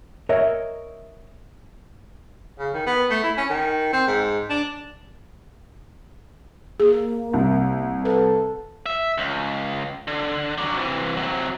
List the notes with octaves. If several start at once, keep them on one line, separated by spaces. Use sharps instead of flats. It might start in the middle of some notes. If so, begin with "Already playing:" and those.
A#4 C#5 D#5 E5
C#3
D#3
B3
A3
E4
C#4
D#3
C4
G#2
D4
A#3 G#4
C2
A4 B4
E5
C#2
D3
F#3 D4
C3 E3
C3 F#3